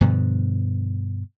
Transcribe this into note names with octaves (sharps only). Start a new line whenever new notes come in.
G2 B2 D3 F3